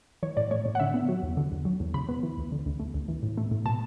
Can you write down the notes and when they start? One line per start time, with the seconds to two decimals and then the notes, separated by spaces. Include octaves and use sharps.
0.23 E3 C#5
0.37 A2 D5
0.51 A3 C#5
0.66 A2
0.75 F#5
0.80 D3 E5
0.94 B3
1.09 F#3
1.23 E2
1.37 D3
1.52 E2
1.65 F#3
1.80 E2
1.94 C#3 B5
2.09 B3
2.23 E3
2.37 D2
2.52 D3
2.66 D2
2.80 A3
2.94 D2
3.08 E3
3.23 A2
3.37 A3
3.51 A2
3.65 B2 A5